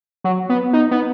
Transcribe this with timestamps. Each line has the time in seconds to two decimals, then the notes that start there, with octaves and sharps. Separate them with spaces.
0.24 F#3
0.49 B3
0.73 D#4
0.91 B3